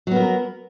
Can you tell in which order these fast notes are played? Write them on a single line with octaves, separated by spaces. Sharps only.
F#3 B3 A#4